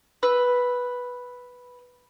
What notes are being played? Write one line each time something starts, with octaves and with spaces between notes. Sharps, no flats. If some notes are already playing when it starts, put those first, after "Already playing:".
B4 E6